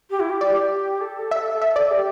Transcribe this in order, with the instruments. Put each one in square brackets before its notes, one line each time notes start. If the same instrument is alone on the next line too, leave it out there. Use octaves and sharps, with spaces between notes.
[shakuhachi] G4
E4
G4
[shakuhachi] G4 [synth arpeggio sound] D5
[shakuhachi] A4
[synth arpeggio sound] E5
E5
D5
[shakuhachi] G4